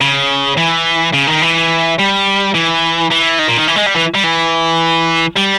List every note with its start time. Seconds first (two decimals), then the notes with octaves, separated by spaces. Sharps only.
0.01 C#3
0.57 E3
1.14 C#3
1.27 D#3
1.42 E3
1.99 G3
2.55 E3
3.11 E3
3.39 D#3
3.48 A#2
3.58 D#3
3.68 E3
3.76 G#3
3.86 G3
3.95 E3
4.14 G3
4.23 E3
5.36 G3